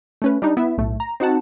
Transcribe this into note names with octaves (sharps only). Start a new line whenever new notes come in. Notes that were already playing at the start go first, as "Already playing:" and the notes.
A3 C#4 B4
G3 D4 D#4
B3 E4 E5
B1 A2 A3
A#5
C4 D#4 F#4 F#5 A5